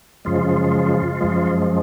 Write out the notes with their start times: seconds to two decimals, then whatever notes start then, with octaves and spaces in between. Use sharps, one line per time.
0.25 F#2 C#3 F3 G#3 F4
1.21 F#2 F3 G#3